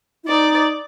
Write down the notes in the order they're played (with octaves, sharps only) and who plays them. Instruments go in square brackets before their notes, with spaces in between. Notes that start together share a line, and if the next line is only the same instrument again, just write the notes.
[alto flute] E4
[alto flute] D#4 [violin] D5